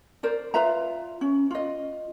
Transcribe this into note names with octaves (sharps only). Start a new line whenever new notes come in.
A#4 C5 D5
F4 B4 E5 A#5
C#4
F4 D#5